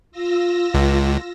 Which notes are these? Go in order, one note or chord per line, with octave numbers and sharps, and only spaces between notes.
F4 E6 A#6
C#2